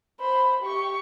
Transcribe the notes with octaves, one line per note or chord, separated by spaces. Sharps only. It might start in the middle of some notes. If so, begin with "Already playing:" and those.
C5 B5
G4 C#6